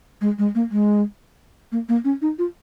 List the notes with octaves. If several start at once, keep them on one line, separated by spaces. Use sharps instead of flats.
G#3
G#3
A#3
G#3
A#3
A#3
C#4
D#4
F4